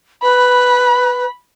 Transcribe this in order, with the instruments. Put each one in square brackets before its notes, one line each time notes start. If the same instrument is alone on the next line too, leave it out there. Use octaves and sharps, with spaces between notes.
[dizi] B4 [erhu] B5